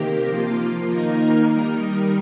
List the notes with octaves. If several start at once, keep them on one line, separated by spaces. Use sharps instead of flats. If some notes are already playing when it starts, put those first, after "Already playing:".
Already playing: C3 D#3 A#3 G4 A#4
F3 A#3 F4
D#3 A#3 D#4 A#4
D#3 G3 D#4 A#4